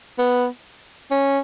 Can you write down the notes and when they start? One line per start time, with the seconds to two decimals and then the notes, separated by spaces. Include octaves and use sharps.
0.19 B3
1.11 C#4